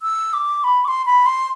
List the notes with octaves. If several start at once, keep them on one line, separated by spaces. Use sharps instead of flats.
E6
D6
B5
D6
C6
B5
C6